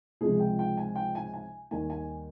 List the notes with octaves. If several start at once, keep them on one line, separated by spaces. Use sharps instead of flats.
C#2 C3 F3 G#3 G#4
G5
G5
G#5
G5
G#5
G#5
D#2 D#3 G3 G#5
G#5